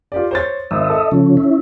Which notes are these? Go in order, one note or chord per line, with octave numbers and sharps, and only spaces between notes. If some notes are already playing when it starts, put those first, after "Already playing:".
F4 G4 D5
C5 C#5 A6
G#1 D#5 E5
A4
C#3 F3 C#4
C#4 E4